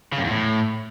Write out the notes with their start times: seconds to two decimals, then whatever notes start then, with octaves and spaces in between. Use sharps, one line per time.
0.12 C#3
0.18 F#2
0.24 E2
0.30 A2